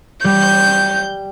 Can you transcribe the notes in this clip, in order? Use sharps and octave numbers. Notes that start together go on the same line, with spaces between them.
G3 G6